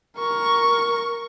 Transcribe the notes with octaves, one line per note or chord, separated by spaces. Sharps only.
A#4 C#6